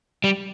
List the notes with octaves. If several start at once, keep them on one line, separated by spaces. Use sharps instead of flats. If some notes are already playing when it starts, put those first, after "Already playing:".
G3